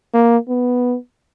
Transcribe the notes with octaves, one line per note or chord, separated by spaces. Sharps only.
A#3
B3